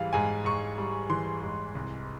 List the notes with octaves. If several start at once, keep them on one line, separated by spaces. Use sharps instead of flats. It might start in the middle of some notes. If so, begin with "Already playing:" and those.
Already playing: G#2 E3 G3 F5
G#2 G#5
G#2 C#6
G3
E3 C6
G#2
C2